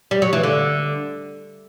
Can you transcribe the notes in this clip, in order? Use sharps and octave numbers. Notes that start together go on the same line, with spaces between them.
G3
F#3
E3
D3